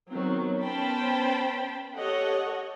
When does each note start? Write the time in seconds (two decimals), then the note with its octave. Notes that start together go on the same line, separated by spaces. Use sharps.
0.10 D#3 F#3 B3 C4
0.61 B3 C#4 C5 G5 A5 B5
1.97 G4 A4 C#5 D#5 F#5